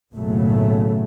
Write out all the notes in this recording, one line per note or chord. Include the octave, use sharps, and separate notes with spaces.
F#1 B1 A2 C#3 F#3 A3